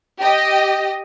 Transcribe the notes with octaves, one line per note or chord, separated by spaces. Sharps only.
G4 D#5